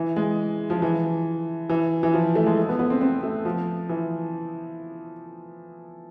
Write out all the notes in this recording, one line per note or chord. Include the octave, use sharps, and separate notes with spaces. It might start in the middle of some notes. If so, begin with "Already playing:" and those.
Already playing: E3
G#3
F3
E3
E3
E3
F3
A3
G#3
A3
B3
B3
C4
C4
A3
F3
E3